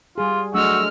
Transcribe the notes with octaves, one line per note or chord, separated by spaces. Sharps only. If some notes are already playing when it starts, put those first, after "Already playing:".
G3 F4 G#4
F#3 G#3 A3 D4 F#4 E6 F6